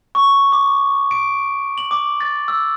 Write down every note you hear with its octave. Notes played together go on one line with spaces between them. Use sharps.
C#6
D6
D7
F#7
D6
A6
E6